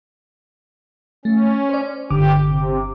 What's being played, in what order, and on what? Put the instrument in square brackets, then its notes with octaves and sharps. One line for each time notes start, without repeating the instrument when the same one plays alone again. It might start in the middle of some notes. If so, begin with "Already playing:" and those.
[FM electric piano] A3 [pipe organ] C#4
[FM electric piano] C5 D5
[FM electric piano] G1 D3 D6 [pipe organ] G4
[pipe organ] C3